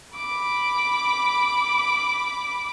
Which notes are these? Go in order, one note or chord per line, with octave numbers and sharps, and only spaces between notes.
B5 D6